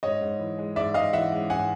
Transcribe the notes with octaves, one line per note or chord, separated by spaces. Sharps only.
G#2 C#5 D#5
G#2
E3
G#3
G#2 D5 E5
G#2 D#5 F5
E3 E5 F#5
G#3
G#2 F#5 G#5